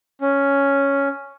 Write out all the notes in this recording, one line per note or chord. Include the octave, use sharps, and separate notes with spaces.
C#4